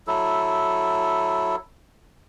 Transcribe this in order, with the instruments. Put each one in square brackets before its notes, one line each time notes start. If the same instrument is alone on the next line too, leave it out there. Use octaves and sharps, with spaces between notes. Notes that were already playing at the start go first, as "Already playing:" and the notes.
[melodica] F#3 E4 A4